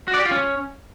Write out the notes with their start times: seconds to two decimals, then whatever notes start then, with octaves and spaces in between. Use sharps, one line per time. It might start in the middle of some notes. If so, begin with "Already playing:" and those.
0.08 F#4
0.14 D5
0.20 G4
0.25 F4
0.31 C#4